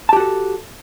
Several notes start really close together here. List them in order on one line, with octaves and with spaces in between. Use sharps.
A5 G4 F#4 A4